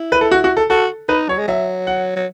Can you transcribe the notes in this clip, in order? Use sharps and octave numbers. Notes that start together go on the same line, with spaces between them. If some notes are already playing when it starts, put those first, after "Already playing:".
Already playing: E4
B4
A4
F#4
F#4
A4
F#4 A4
D#4 B4
F#3 C#5
G#3
F#3 E5
F#5
F#3